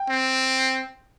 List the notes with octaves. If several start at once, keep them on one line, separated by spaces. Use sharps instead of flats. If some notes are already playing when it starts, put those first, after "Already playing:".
Already playing: G5
C4